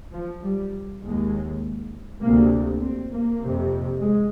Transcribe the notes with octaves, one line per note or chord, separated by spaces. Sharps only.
F3
G3
D#2 G#3
D2 C3 A#3
C4
A#3
F2 C3
G#3